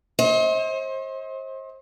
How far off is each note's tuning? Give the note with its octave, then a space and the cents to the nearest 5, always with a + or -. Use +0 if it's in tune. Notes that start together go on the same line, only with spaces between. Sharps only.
C5 +35 D#5 +40